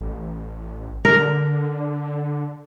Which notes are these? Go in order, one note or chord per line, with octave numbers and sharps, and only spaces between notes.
A1
D3 A#4